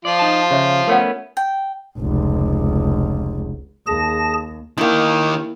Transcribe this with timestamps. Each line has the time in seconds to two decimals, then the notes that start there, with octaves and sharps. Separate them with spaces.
0.05 F3 F4 D5
0.19 D#4 A5
0.51 C#3 G4 C#5 E5
0.87 A3 B3 C#4 A#4 C#5 F#5
1.37 G5
1.98 F1 C#2
3.87 D#2 G#4 A5 A#6
4.78 D#3 A#3 E4 G4